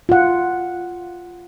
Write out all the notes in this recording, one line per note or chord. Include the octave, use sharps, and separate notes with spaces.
F4 F#5